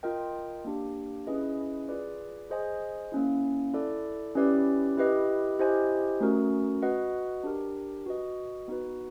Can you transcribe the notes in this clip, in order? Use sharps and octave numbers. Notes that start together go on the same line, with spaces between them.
F4 A#4 D#5 G5
A#3 D4 G4
C#4 E4 G#4 B4 D#5
F4 G#4 B4 D5
G#4 C5 D#5 G#5
A#3 C#4 E4
E4 A4 D5
C#4 E4 G4 B4 D5
E4 G4 B4 D#5
E4 G4 C5 D#5 G#5
A3 C#4 F#4 A#4
F#4 B4 D#5 F#5
D4 G4 A#4
F#4 B4 D#5
B3 D#4 F#4 B4